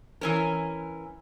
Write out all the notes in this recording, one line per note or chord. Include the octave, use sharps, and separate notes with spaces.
E3 C#4 A#4